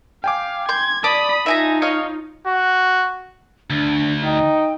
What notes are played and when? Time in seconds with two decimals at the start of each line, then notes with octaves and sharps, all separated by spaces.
0.24 F5 G5 G#5 D6
0.69 C6 G6 G#6
1.04 D5 A5 B5 D#6
1.46 D#4 F4 E5 G#5 A#5
1.82 C#5 D#5 F5
2.47 F#4
3.70 D2 D4
4.23 D#4 G5